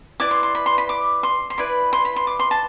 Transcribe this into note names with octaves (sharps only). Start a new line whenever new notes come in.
E4 B4 D5 D6
C6
C6
B5
C6
B5
D6
C6
C6
E4 B4 D5 B5
C6
B5
C6
D6
C6
A5